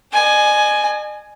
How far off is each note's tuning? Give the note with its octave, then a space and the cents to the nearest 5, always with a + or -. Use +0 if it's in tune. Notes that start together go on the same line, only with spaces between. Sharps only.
D#5 -45 G#5 +10